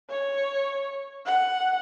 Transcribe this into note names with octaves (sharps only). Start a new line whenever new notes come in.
C#5
F#5